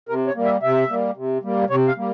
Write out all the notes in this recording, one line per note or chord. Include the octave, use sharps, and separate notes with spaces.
C3 A#4
C#5
G3 A#3
E5
C3 E5
G3 A#3
C3
G3 A#3
C3 C#5
F5
G3 A#3